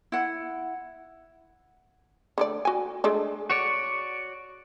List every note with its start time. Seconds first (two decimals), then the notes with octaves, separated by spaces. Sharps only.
0.12 E4 F#5
2.38 D3 A3 D5
2.65 F#4 G#5
3.04 G#3 A3 D4
3.50 F#4 C#5 D5